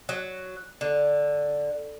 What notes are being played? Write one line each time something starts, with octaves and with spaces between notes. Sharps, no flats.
F#3
D3